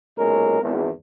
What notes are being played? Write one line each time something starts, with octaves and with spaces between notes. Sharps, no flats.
B1 A#2 G#3 C#4 A#4
G#1 E2